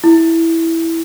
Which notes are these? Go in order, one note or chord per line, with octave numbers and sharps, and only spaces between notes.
E4